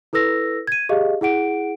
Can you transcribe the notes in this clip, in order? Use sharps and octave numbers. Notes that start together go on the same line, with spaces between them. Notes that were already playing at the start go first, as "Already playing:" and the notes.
E4 A4 B4 E6 A#6
G#6 D#7
G4 G#4 D#5 F5
E4 G#4 F#5 D7